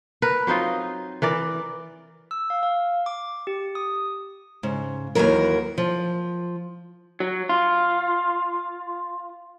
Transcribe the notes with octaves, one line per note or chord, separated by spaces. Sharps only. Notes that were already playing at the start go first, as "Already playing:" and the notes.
A#4 B4
F#3 C4 D#4 F4
E3 A#4 D5
E6
F5
F5
D6
G4
D#6
G#2 C#3
D#2 D#3 E3 F#3 A#4
F3
F#3
F4